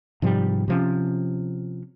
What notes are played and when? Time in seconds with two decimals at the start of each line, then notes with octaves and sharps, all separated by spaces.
0.22 G#2 C3 F3 G3
0.68 C3 F3 C#4